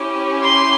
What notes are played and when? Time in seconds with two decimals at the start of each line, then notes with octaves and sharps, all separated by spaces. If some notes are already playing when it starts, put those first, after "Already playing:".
Already playing: C#4 E4 G4
0.43 C6